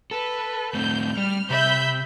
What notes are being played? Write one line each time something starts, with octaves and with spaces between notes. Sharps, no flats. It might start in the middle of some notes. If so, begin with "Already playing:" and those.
A4 B4
A2 A3 C4 G6
G3 F6
C3 E5 B5 G6